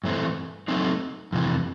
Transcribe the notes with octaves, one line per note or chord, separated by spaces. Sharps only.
G2 E3 A3 C4
F#3 A3 C4 D#4
F2 C3 E3